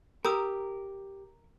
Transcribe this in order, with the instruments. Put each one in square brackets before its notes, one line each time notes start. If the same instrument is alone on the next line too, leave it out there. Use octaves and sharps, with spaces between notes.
[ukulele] G4 [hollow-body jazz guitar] A#4 [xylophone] A#5 D#6 E6